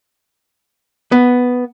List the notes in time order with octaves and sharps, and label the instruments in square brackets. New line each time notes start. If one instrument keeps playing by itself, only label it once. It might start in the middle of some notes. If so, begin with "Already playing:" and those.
[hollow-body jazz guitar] B3